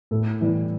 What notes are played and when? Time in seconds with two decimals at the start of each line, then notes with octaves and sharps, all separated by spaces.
0.11 A2 A4
0.41 E3 G3